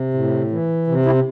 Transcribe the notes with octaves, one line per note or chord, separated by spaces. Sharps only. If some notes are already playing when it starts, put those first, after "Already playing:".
Already playing: C3
A2
E3
C3
C4 E4